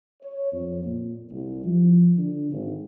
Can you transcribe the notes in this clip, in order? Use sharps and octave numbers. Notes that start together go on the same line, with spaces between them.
C#5
F2
A#2
C2
F3
D3
G#1